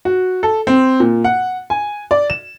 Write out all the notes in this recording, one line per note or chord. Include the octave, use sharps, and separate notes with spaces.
F#4
A4
C4
A#2
F#5
G#5
D5
E7